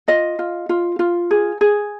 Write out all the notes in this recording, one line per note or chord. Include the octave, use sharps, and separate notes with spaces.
F4 D#5
F4
F4
F4
G#4
G#4